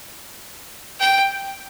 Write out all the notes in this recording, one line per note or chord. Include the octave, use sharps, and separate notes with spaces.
G5